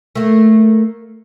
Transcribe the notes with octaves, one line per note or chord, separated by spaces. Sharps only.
A3 A#3